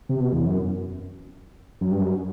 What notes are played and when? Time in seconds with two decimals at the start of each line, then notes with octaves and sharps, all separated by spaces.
0.09 C3
0.20 B2
0.33 E2
0.46 F#2
1.81 F#2
1.91 G2
2.01 F#2